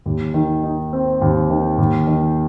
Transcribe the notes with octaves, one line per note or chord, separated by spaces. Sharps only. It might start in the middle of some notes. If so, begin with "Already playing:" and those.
D#2
D#3
D#4
C4
D#2
D#3
D#2
D#3